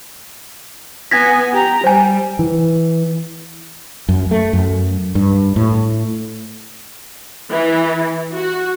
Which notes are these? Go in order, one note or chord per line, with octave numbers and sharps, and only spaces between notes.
B3 G#5 G#6 A#6 B6
G4 A#5
G3 C5 G#5
E3
F#2
A3
F#2
G2
A2
E3
F#4